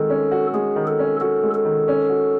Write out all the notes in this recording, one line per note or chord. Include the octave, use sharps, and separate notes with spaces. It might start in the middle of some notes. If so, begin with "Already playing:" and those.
Already playing: D#3 G#3 F#4 A4
C#4
F#4
G#3 G#4
D#3
A4
C#4
F#4 A4
G#3
A4
D#3
C#4
F#4